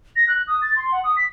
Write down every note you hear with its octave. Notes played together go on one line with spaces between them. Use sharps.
A#6
F#6
D#6
A6
C6
F#5
D#6
B6